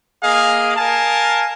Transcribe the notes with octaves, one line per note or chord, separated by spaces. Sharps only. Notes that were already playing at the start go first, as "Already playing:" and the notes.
A#3 G#4 D#5 F5
A#4 F5 G#5 A5